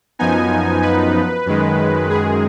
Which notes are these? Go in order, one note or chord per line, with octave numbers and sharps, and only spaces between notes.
F#2 F3 B3 D#4 G#5
B4
F#2 D#3 G#3
G#4